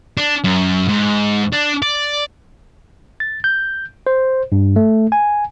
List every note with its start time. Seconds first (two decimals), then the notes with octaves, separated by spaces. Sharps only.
0.17 D4
0.44 F#2
0.89 G#2
1.53 D4
1.82 D5
3.20 A6
3.44 G6
4.07 C5
4.52 G2
4.76 A3
5.12 G#5